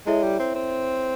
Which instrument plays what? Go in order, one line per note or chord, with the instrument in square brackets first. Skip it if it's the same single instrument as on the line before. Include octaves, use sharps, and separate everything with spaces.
[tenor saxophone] G#3 [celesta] E4 A4 C#5 E5
[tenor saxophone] G3
C4
C4